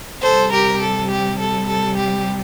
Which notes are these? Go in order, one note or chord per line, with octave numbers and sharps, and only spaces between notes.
C3 G3 A4 C5
G4 A#4
A4
G4
A4
A4
G4